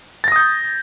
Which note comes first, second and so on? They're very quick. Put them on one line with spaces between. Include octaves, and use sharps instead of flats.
A6 A#6 D#6 G6